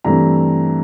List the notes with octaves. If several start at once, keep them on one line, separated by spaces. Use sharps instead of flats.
G2 E3 A3 C4 A#5